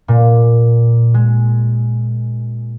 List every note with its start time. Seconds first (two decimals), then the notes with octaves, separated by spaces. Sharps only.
0.08 A#2
1.14 G#3